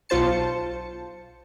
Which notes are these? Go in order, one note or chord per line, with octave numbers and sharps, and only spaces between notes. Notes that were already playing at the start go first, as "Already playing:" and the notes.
B1 F4 C5 A5 C#7